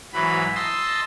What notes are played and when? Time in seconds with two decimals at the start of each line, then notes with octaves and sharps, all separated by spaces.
0.13 G#2 E3 F#3 B5
0.55 D#5 A5 C6 E6